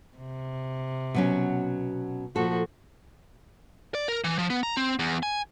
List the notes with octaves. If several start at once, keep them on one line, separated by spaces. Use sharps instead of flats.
C3
B2 F#3 C#4
A#2 F3 F#4 A4
D5
A#4
E3
F3
B3
A#5
C4
E2
G#5